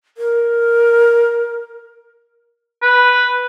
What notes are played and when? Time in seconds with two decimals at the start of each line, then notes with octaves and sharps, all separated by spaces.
0.17 A#4
2.82 B4